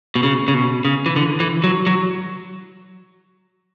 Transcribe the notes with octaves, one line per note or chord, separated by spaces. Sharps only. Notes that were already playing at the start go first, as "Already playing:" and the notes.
B2
C#3
C#3
B2
C#3
E3
D3
E3
F#3
F#3